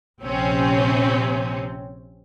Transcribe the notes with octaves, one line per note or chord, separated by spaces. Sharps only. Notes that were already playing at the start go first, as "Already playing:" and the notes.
A#1 C3 C4 C#4